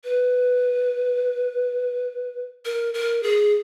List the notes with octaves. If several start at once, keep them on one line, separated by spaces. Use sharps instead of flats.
B4
A#4
A#4
G#4